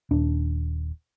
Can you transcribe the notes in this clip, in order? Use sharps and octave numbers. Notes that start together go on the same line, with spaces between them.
D#1 D4